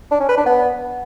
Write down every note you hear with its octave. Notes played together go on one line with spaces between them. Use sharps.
D4
C#4
B4
D4
B3